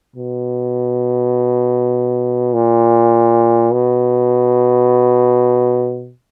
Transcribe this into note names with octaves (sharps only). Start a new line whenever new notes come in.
B2
A#2
B2